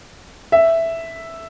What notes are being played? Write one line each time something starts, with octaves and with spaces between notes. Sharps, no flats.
E5